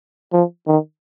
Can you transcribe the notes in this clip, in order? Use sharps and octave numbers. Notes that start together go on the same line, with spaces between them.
F3
D#3